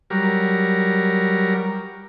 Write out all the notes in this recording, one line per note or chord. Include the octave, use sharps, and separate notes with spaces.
F#3 G3 A#4